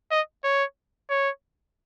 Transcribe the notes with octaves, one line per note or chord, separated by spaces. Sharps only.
D#5
C#5
C#5